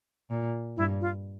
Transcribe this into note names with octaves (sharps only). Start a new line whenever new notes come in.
A#2
G2 E4
F4